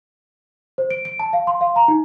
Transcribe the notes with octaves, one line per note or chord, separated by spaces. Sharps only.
C5
D7
D7
A5
F5
C6
F5
A#5
D#4